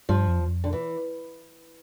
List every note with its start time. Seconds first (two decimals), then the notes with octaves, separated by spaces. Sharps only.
0.09 G2 F3
0.28 F2
0.40 E2
0.48 F2
0.64 D3
0.73 E3